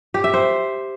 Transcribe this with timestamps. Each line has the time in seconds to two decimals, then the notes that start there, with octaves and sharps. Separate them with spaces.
0.14 G4
0.24 E5
0.34 C5